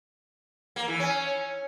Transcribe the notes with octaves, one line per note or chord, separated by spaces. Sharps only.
A#3
E3
C#4